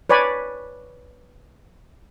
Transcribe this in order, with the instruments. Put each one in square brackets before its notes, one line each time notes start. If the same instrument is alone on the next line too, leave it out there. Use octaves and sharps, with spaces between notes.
[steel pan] B4 C#5 D5 G#5 B5